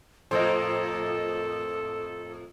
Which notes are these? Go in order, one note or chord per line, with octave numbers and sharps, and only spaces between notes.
F2 A2 A#3 A4 C5 D#5